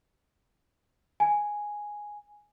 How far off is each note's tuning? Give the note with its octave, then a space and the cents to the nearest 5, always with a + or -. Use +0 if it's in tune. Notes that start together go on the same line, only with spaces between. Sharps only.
G#5 +0